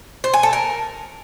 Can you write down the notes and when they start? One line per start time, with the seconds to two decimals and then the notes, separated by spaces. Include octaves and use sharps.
0.24 C5
0.34 G#5
0.43 A4
0.53 A#4